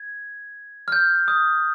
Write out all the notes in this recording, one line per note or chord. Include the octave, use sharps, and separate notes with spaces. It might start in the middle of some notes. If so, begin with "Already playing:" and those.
Already playing: G#6
F6
G6
D#6